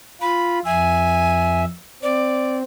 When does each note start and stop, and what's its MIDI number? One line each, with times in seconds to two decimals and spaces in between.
0.21 0.60 65
0.21 0.59 83
0.65 1.65 41
0.65 1.65 76
0.65 1.62 80
2.03 2.63 60
2.03 2.57 74